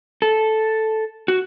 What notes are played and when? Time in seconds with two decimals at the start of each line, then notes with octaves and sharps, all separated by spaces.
0.22 A4
1.28 F#4